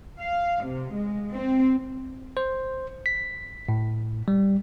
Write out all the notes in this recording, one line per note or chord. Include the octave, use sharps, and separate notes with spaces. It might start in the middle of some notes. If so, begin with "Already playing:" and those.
F5
C3
G#3
C4
C5
B6
A2
G3